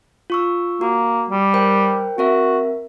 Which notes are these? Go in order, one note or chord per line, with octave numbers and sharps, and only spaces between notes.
F4 C#6 E6
A#3 F#4
G3
A#4 C5 G5
C4 F#4 A#4 E5